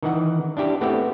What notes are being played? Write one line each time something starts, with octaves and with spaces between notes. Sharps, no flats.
D#3 E3 F#5
D4 E4 G4
A3 B3 C4 E4 G4